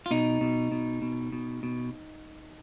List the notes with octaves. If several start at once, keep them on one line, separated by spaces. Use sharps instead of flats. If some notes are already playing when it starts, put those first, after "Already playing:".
F4
B2 D#4
B2
B2
B2
B2
B2